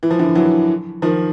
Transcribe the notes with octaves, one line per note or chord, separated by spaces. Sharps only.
E3
F3
D3 E3
E3 F#3
D#3 F3